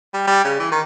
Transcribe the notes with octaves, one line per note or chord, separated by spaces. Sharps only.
G3
G3
C#3
E3
D#3